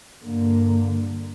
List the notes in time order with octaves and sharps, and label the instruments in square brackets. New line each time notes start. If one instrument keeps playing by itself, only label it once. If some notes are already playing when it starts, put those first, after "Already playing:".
[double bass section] G2 D3 A#3